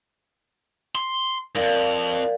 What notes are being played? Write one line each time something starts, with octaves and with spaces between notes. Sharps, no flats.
C6
F2 G#2 A#4 D5 F5